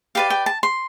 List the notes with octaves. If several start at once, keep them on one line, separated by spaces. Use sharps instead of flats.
G4 B4 D5 F5
G5
A5
C6